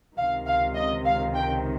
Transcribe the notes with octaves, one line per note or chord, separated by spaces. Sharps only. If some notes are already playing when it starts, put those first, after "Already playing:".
C#2 C3 D#3 F5
F5
D#5
F5
G5